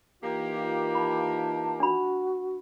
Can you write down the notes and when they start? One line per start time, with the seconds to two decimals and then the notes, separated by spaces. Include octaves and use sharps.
0.23 E3 A#3 D#4 F4 G4
0.95 A5 B5
1.80 D4 F#4 B5